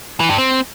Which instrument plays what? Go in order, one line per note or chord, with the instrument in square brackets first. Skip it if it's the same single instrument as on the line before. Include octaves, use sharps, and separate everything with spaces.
[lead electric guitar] E3
G2
C4